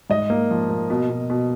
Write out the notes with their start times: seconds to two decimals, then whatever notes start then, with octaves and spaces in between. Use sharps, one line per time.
0.10 G#2 D#5
0.30 A#3
0.51 F3
0.70 A#3
0.90 B2
1.10 B2
1.30 B2